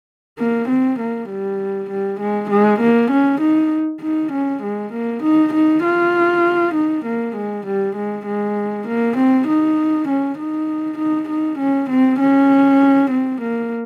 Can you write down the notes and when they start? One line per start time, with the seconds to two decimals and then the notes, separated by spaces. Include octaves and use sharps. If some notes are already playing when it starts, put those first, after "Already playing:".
0.38 A#3
0.69 C4
0.99 A#3
1.29 G3
1.90 G3
2.21 G#3
2.50 G#3
2.80 A#3
3.11 C#4
3.41 D#4
4.02 D#4
4.32 C#4
4.63 G#3
4.93 A#3
5.23 D#4
5.54 D#4
5.84 F4
6.74 D#4
7.05 A#3
7.36 G#3
7.66 G3
7.96 G#3
8.26 G#3
8.87 A#3
9.17 C4
9.47 D#4
10.08 C#4
10.38 D#4
10.98 D#4
11.29 D#4
11.59 C#4
11.90 C4
12.20 C#4
13.11 C4
13.41 A#3